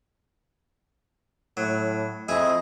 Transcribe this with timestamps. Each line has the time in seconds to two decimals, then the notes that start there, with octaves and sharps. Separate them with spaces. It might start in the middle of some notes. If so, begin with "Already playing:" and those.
1.57 A2 F#3
2.29 F2 E4 G#4 D#5